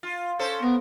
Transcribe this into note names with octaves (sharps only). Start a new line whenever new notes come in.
F4
C#4 A4 C5
B3 A#4